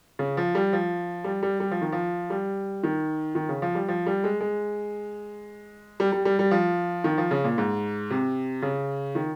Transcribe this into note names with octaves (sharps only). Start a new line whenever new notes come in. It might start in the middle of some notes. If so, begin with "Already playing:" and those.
C#3
F3
G3
F3
G3
G3
G3
F3
D#3
F3
G3
D#3
D#3
C#3
F3
G3
F3
G3
G#3
G#3
G3
G3
G3
G3
F3
D#3
F3
C#3
A#2
G#2
C3
C#3
D#3